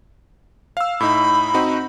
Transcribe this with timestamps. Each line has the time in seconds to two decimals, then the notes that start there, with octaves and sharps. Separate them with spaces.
0.77 F5 E6
1.00 A2 D#4 B5
1.54 C4 D#4 F#4